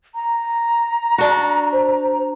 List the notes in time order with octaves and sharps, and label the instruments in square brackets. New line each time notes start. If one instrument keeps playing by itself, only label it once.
[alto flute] A#5
[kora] D4 F#4
[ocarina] C5